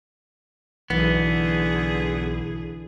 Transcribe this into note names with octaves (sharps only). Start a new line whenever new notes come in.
B1 D3 E3 B3 G#4